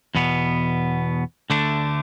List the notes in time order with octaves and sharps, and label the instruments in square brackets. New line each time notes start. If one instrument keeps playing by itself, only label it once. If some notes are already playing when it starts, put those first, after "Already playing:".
[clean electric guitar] E2 B2 B3
D2 D3 A3 D4